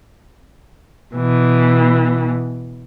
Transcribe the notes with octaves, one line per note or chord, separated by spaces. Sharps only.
B2 E3